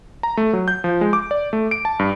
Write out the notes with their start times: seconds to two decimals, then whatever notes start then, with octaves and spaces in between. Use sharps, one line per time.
0.23 A#5
0.37 A3
0.53 F#3
0.68 G6
0.84 F3
1.01 G#3
1.13 D6
1.31 D5
1.53 A3
1.71 D7
1.85 A5
1.99 G2